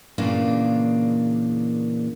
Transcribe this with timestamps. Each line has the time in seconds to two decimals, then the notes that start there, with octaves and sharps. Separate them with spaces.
0.18 E2 A#2 C#3 E3 A#3 D4